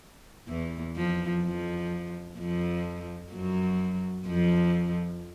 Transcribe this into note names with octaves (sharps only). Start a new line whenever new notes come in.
E2 E3
F2 F3
F2 F3
F2 F3
F#2 F#3
F2 F3